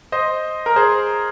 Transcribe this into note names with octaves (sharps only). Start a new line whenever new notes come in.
C5 D#5
A#4
G#4 C5